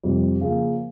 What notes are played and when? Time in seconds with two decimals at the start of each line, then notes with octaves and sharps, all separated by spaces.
0.04 F2 C3 G3
0.41 C#3 F3 A#3